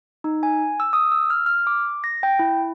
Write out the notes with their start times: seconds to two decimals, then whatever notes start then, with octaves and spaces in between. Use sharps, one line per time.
0.24 D#4
0.43 G#5
0.80 E6
0.93 D#6
1.12 E6
1.30 F6
1.46 F6
1.67 D6
2.04 A#6
2.23 G5
2.39 E4